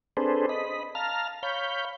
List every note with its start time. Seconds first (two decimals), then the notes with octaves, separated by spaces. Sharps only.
0.17 C4 D4 G#4 A4 B4 C5
0.49 D#5 B5
0.95 F5 A5 A#5 F6
1.43 C#5 F5 B5 G6